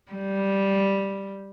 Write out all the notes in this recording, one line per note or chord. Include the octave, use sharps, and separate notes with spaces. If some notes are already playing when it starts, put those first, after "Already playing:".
G3